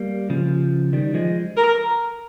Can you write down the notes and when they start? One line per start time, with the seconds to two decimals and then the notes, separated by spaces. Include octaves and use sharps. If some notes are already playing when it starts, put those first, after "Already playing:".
Already playing: G3 A#3
0.30 C#3 F3
0.93 D#3 G3
1.14 F3 G#3
1.57 A#4